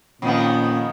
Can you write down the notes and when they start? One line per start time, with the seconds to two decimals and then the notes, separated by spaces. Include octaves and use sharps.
0.22 F2 A#2 D#3 B3 C#4